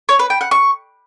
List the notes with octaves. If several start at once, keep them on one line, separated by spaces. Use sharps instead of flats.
C#5
B4
G5
F#5
C#6